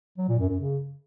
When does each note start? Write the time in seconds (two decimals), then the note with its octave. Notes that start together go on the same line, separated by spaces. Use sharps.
0.18 F#3
0.29 A#2
0.39 F#2
0.49 F#2
0.60 C#3